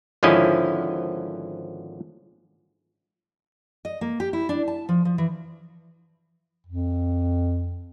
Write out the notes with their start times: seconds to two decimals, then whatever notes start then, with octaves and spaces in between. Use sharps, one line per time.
0.23 G#1 D3 F3 C#4 E4 D#5
3.85 D#5
4.01 A#3
4.20 G4
4.33 E4
4.49 D4
4.68 A5
4.89 F3
5.05 F3
5.18 E3
6.66 F2